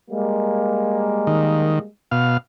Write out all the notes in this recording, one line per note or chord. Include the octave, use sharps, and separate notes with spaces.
G3 G#3 A#3
D#3
B2 F5